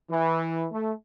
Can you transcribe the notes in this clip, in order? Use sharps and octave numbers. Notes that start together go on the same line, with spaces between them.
E3
A3